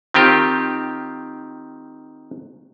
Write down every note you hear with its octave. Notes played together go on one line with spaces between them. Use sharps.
D#3 C4 F4 G4 A#4